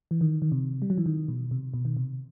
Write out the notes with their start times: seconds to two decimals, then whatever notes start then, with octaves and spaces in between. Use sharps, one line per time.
0.11 E3
0.21 D#3
0.42 D#3
0.52 C3
0.82 G3
0.90 F#3
0.98 E3
1.06 D#3
1.28 B2
1.51 C3
1.74 B2
1.85 D#3
1.97 C3